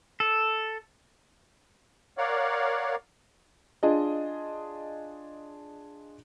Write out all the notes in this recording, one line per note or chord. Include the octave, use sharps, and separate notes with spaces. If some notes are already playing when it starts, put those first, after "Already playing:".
A4
A#4 C#5 D5 F5 F#5
D4 F4 G#4 D#5